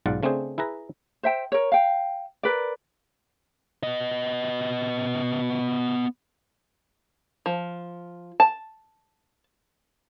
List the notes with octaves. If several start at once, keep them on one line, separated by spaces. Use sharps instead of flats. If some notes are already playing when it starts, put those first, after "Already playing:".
B1 G#2 F4 D5 F#5
C#3 A3 C4 D4 G#4 C5
E4 G#4 B4 A#5
C5 E5 G5
A#4 C#5
F5 G5
A#4 B4 D5
B3 D#5
F3
A5